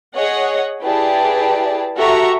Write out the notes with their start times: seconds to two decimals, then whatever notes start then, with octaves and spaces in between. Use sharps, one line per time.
0.15 G#4 C#5 D#5 F#5
0.83 E4 G4 G#4 B4 D5 A5
1.97 F#4 G4 A4 E5 A#5 C#6